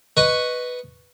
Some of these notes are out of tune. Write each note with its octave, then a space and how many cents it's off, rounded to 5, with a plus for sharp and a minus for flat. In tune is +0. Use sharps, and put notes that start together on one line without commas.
B4 +0 D#5 +0 C#6 +0